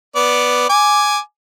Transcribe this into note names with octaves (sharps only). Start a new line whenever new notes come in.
B3 D5
G#5 D6